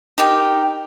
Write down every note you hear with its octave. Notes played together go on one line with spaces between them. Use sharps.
D#4 G4 A#4 G5